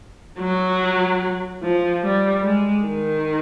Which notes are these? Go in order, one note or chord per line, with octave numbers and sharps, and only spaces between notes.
F#3
F3
G3
G#3
D#3